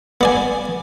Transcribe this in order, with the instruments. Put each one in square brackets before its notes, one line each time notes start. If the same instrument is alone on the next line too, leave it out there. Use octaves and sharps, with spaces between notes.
[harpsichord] B3 D5 G#5